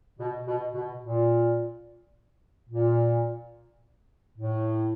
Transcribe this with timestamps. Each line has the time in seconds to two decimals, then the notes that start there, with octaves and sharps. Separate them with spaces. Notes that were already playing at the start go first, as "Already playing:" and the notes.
0.19 B2
0.47 B2
0.74 B2
1.03 A#2
2.70 A#2
4.38 A2